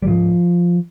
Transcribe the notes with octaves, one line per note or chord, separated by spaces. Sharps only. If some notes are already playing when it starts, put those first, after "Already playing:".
G3
G#2 F3